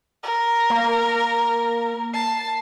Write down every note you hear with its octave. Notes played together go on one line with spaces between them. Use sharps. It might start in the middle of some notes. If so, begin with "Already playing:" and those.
A#4
A#3
A5 C7